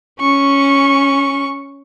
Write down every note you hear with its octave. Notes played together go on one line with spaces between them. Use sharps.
C#4 C#6